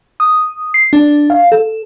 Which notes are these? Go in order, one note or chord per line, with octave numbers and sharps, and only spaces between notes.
D#6
C7
D4
F5
A4